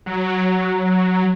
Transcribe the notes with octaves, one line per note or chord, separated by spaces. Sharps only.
F#3